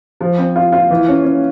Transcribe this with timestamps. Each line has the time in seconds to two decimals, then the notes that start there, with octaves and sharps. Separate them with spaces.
0.21 F3
0.38 C4
0.56 F4
0.72 F4
0.90 E3
1.08 C#4
1.25 C#4